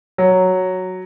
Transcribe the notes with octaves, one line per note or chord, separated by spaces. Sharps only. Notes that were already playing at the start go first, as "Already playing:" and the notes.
F#3